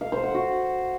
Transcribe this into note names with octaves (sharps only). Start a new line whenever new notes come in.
F5
C5
F#5
F#4